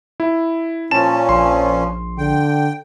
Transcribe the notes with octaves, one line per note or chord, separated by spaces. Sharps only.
E4
A#2 F3 C#4 A5 E7
A#1 C6
D3 G5